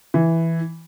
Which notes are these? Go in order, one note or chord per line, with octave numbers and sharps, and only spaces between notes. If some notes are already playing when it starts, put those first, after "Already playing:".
E3